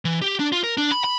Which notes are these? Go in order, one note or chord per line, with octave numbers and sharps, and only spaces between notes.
E3
G4
D4
F4
A#4
D4
B5
B5